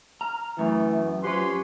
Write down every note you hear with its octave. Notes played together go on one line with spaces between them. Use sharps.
A#5 F6
F#2 E3 A3
F3 C#4 G4 B4 C6